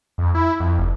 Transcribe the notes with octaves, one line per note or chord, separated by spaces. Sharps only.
F2
E4
F2
F1